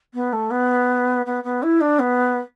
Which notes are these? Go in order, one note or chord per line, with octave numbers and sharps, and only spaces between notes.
B3
A3
B3
B3
B3
E4
D4
B3